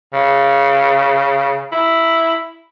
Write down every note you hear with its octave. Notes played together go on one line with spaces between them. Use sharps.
C#3
E4